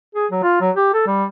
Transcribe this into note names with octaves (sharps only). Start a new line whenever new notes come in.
G#4
F#3
F4
F#3
G4
A4
G3